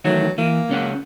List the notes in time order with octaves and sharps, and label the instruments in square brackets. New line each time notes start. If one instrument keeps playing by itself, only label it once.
[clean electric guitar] D#3 E3 A3 [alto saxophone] F#3
[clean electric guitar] E3 [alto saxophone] A#3
[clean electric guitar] C#2 C#4 F#5